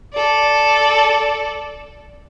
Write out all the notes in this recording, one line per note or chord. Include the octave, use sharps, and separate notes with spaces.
A4 D5